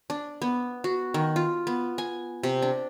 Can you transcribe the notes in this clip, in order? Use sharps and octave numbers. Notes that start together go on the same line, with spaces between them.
D4
B3
F#4
D#3
F4
B3
G#5
C3
D4